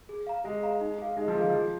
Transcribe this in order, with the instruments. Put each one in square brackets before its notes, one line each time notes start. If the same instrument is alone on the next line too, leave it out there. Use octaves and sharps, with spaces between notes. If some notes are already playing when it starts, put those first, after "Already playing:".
[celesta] G#4
F5 A#5
[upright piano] G#3 [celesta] G#4
[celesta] F5 A#5
D#4
G#4 F5
[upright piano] G#3 [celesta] D#4
[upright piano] F3
[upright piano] D#3 [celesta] G#4 F5
[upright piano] F3 [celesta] G#4